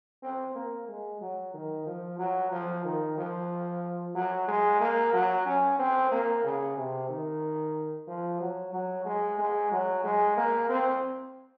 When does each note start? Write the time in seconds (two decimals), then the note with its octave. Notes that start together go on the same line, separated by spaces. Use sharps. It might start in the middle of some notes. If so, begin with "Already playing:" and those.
0.23 C4
0.55 A#3
0.88 G#3
1.21 F#3
1.54 D#3
1.86 F3
2.19 F#3
2.52 F3
2.85 D#3
3.18 F3
4.15 F#3
4.48 G#3
4.80 A#3
5.14 F#3
5.46 C#4
5.79 C4
6.11 A#3
6.44 C#3
6.77 C3
7.09 D#3
8.07 F3
8.41 F#3
8.73 F#3
9.06 G#3
9.39 G#3
9.71 F#3
10.04 G#3
10.37 A#3
10.69 C4